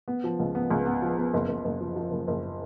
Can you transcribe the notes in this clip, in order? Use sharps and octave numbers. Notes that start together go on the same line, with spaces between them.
B3
F3
C#2
B3
C#2
B3
F3
B3
F#1
F#1
F#1
F3
F3
F#1
F#1